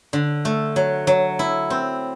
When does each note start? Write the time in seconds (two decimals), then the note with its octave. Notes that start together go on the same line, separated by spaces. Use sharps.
0.13 D3
0.45 A3
0.76 F#3
1.07 F#3
1.39 E4
1.70 C4